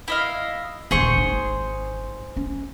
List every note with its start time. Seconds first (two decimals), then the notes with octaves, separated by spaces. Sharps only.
0.08 E4 D#5 F5
0.91 D#1 C#2 G#4 C5 C#6
1.16 G#1 D#4
2.37 C#4